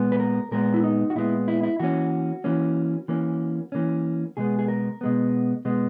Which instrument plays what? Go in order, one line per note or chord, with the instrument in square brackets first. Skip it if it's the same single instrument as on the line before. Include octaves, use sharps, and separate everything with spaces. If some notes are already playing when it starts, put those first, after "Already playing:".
Already playing: [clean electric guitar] A#2 G#3 B3
B4
A#4
A#2 G#3 B3 A#4
E4
D#4
F#4
A#2 G#3 B3 E4
E4
E4
E3 A#3 C#4 F#4
E3 A#3 C#4
E3 A#3 C#4
E3 A#3 C#4
B2 G#3 B3 G#4
G#4
A#4
B2 G#3 B3
B2 G#3 B3